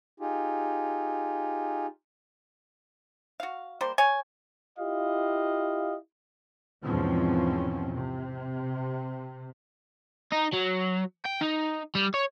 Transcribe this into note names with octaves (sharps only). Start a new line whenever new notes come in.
D#4 F4 G4 G#4
F#4 F5
G3 A#3 C5
C#5 G#5
E4 F4 G4 D#5 F5
E2 G#2 B2 F3 C4 C#4
C3
D#4
F#3
G5
D#4
G3
C#5